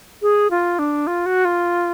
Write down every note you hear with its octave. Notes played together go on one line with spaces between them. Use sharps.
G#4
F4
D4
F4
F#4
F4